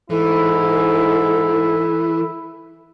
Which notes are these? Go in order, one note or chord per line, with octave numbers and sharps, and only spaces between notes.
G#2 E3 E4 A4